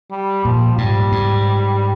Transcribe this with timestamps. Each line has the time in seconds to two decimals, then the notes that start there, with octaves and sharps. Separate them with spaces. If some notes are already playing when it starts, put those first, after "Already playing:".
0.11 G3
0.45 A#2 F3
0.78 G#2 G3
1.12 G#2